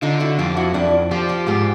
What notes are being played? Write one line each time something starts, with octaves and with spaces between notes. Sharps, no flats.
D3 D#4 F4
E4 F#4
F2 F4 G4
E4 F#4
F2 D4 E4
F3 F4 G4
F4 G4
G#2 F4 G4